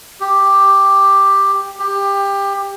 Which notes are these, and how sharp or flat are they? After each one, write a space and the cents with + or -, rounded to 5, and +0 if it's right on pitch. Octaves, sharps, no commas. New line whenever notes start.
G4 +5
G4 +20